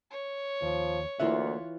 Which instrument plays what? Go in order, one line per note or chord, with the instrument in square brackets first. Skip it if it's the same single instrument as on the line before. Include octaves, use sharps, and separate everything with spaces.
[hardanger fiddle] C#5
[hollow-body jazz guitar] D#2 [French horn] F3
[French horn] D2 [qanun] E3 F4 F#5 [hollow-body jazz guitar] A#3 A#4 E5